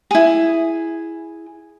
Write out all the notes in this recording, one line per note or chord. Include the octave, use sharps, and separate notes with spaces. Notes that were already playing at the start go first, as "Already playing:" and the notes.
E4 G#4